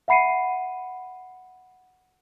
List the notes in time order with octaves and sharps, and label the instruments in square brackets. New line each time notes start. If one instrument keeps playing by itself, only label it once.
[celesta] E5 F#5 B5 C7 C#7 D#7